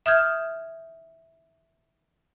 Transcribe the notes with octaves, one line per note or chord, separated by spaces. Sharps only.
E5 D#6 F6 G6 G#6